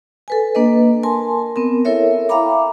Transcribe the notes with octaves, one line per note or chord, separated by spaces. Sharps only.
A4 B4 G#5
A#3 D4 B4 D#5
A#4 G#5 A5 C6
B3 C4 A#4
E4 A4 A#4 C#5 E5
E5 F5 G5 A#5 B5 D6